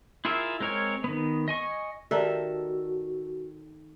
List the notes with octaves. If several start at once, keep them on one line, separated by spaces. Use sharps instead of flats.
E4 F4 G#4 A#4 E5
G#3 C4 A#4 C#5 G#5
D#3 B3
D#5 G#5 C#6
D#3 F#4 G4 A4 D5 E5 A#5